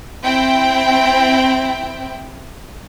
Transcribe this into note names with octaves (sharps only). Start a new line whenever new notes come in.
C4 E4 G5